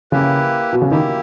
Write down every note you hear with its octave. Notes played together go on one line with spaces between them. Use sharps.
C#3 A#3 E4 G4 B4
B2
C#3
D#3 A#3 E4 G4